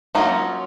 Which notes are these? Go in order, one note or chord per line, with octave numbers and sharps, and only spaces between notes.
F#3 A#3 C#4 D#4 F4